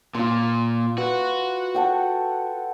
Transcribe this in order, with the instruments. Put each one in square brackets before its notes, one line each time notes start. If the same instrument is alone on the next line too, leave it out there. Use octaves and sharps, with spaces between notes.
[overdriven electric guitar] A#2 [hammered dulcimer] F4 C6
[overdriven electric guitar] F#4 [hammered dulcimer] B4
[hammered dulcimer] A4 F#5 G5